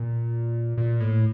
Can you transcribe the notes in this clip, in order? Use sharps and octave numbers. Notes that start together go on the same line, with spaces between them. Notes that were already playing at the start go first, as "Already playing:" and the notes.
Already playing: A#2
A#2
A2